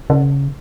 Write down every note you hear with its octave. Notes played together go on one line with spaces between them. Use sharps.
C#3